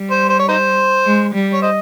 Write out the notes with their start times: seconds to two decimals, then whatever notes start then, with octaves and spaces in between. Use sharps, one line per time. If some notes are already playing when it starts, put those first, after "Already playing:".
Already playing: G3
0.11 C5
0.29 C5
0.39 C#5
0.48 D#4 C5
1.06 G#3
1.34 G3
1.53 C#5
1.62 C5 D#5